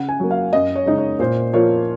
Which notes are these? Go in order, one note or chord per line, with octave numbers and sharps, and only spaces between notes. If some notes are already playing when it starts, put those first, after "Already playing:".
Already playing: C#3 F#5
G#5
F#3 A#3
F5
F#2 D#5
C#5
C#3 G#3 D#4
C#5
A#2 C5
F3 A#3 F4 C#5